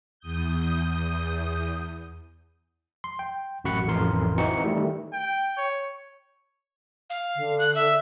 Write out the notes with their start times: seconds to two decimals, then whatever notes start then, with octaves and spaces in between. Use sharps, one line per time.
0.19 E2 D#6 G6
3.04 C6
3.19 G5
3.64 A1 F#2 F#4 B5 F#6 C#7
3.87 A1 F2 D3 E3 A#4 C6
4.38 E3 C4 D#4 F#4 C#7
4.64 D#3 G3 A3
5.13 G5
5.57 C#5
7.10 F5
7.36 D3
7.59 F#6
7.75 E5